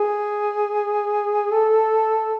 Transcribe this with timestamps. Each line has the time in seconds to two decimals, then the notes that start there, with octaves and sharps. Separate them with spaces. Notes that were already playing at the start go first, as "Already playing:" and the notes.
Already playing: G#4
1.52 A4